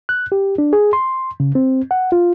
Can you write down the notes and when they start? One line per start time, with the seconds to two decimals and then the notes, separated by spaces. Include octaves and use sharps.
0.09 F#6
0.32 G4
0.58 D4
0.73 G#4
0.93 C6
1.40 C#3
1.55 C4
1.91 F#5
2.12 F4